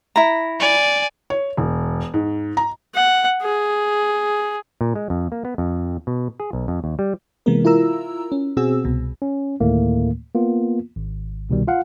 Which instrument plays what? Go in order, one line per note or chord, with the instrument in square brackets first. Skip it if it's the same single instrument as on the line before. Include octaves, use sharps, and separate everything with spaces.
[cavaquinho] E4 A#5
[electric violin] D5 G#5
[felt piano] C#5
E1
G#2
A#5
[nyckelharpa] F#5
G#4
[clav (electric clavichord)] A#2
G#3
F2
A#3
B3
F2
B2
G#4
B1
F2
D#2
G3
[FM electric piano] C3 E3 G#3 A#3 B3 A#4
E4 F4 A#4 A#5 E6
C#4
B2 C4 F#4 G#4 E6
C2 B2
[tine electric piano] C#4
D2 A2 D#3 A3 A#3
A#3 B3 F4
G#1
C2 B2 D#3 G3
F4 F5 F#5